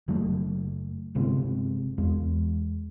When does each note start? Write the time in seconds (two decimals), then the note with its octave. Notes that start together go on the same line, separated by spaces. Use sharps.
0.08 F#1 F#3 A3
1.15 G1 C3 G#3 C4
1.98 E2 G#3